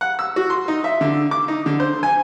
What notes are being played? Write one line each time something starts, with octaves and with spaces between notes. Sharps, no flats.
F#5
E6
F#4
C6
D#4
E5
D3
D6
D#4
D3
C5
G#5